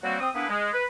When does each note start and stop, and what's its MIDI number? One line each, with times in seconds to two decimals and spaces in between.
0.03 0.17 54
0.03 0.17 55
0.03 0.17 58
0.03 0.17 60
0.03 0.17 66
0.20 0.29 60
0.20 0.29 87
0.35 0.45 58
0.35 0.45 59
0.35 0.45 62
0.35 0.45 64
0.35 0.45 68
0.35 0.45 71
0.49 0.68 56
0.73 0.84 71